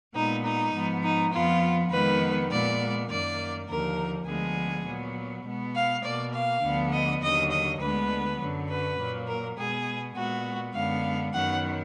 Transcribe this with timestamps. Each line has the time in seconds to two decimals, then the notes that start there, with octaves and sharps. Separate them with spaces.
0.15 A#2 G#3 B3 D#4
0.45 D#4
0.74 G#2 F3 B3
1.04 D#4
1.33 F2 F3 B3 F4
1.92 F2 D#3 G#3 B3 B4
2.51 A#2 G#3 B3 D5
3.10 F#2 D#3 A#3 D5
3.69 D#2 D3 F3 A#3 A#4
4.27 D2 D3 F3 G#3 B3 G#4
4.86 A#2 F#3 B3
5.45 B2 G#3 B3
5.75 F5
6.04 B2 A#3 D5
6.34 F5
6.63 D2 D3 F3 B3
6.93 D#5
7.22 D#2 D3 F#3 D#5
7.51 D#5
7.81 D2 D3 G#3 B3 B4
8.40 F#2 D3 F#3
8.69 B4
8.99 A#2 F#3 A#3
9.28 A#4
9.58 B2 G#3 B3 G#4
10.16 A#2 G#3 B3 F#4
10.75 F#2 D3 G#3 B3 F5
11.34 F#2 D#3 F#3 B3 F#5